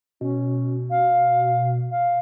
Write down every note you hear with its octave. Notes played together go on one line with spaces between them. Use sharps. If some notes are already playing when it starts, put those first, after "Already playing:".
B2 C#4
F5
F5